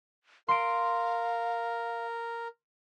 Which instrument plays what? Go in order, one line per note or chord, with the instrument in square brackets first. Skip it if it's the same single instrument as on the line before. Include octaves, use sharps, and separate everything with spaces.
[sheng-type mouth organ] A#4 [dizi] F5 [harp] C6 D7